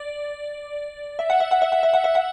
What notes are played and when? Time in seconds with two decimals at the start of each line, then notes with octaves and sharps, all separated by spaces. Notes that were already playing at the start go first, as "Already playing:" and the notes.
Already playing: D5
1.19 E5
1.30 F#5
1.40 E5
1.51 F#5
1.62 E5
1.72 F#5
1.83 E5
1.94 F#5
2.04 E5
2.15 F#5